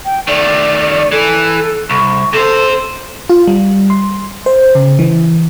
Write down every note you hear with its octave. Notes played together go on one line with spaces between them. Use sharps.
G5
D#3 A3 D5
E3 A4
C2 C#6
C3 A4 C5
F4
G3
C6
C5
C#3
E3